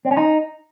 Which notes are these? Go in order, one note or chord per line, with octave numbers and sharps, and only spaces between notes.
C4
C#4
D#4